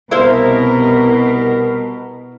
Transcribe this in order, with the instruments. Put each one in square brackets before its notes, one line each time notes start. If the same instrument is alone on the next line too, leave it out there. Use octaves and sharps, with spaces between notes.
[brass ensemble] C2 A#4 [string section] B2 [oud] E4 C5 F5